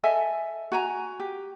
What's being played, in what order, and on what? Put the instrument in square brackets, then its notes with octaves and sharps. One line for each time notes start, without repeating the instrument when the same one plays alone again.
[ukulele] A4 D#5 E5 G#5
F#4 G#5 A#5
G4